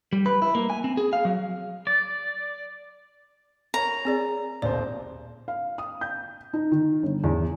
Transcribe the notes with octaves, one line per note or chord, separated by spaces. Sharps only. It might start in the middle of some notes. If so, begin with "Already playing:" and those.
G3
B4
E4
A#3
G#5
C4
G#4
F5
F#3
D5
A#4 C#5 A#5
C4 G#4 D5
D#1 B1 C5 D5
F5
D#6
G6
D#4
D#3
G1
E2